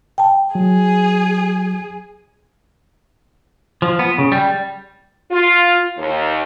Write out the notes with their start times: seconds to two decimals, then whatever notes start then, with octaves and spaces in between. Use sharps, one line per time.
0.18 G5 A5
0.55 F#3 G#4
3.82 F3
3.99 B3
4.18 C#3
4.32 G3
5.31 F4
5.98 D#2